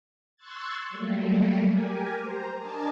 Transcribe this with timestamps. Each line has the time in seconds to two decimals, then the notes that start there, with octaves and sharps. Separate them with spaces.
0.36 C6 C#6 E6 F#6 G#6 A6
0.89 F#3 G3 A3 A#3
1.67 G4 A#4 G#5
2.22 C5 A#5
2.58 D4 A#4 D5 D#5 G#5 A5